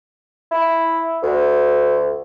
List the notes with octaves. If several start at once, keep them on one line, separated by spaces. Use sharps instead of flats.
E4
D2